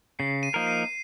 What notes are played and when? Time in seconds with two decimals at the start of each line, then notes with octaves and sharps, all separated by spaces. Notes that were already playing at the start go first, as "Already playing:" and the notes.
0.19 C#3 C7
0.43 D#7
0.54 F3 A#3 D#4 A#4
0.67 C7